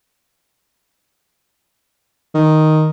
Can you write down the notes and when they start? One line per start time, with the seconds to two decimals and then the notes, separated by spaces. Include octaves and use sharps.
2.35 D#3